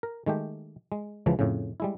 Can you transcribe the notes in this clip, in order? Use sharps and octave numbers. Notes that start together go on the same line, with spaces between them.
A#4
D#3 G#3 A3 G4
G#3
C#2 C#3 E3 F3
F2 A2 C#3
G3 G#3 E4